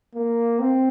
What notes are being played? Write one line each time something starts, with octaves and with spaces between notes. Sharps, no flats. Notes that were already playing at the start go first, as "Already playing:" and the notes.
A#3
C4